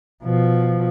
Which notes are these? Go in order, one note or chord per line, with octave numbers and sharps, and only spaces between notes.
B2 F3